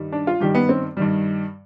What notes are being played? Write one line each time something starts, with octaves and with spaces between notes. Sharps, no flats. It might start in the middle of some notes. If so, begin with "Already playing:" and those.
Already playing: G2 D#3 G3
D4
F4
G2 D#3 G3 G4
B3
C4
G2 D#3 G3